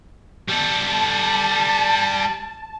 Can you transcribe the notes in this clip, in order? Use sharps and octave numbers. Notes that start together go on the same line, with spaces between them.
G3 A4 A5